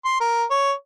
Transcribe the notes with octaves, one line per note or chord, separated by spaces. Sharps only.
C6
A#4
C#5